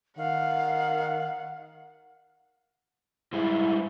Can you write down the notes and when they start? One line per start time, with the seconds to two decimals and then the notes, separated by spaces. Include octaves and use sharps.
0.18 D#3 F5 F#5
3.33 G#2 G3 E4 G#4